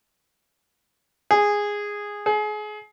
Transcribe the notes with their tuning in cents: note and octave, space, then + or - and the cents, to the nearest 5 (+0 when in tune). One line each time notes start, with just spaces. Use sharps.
G#4 -10
G#4 +30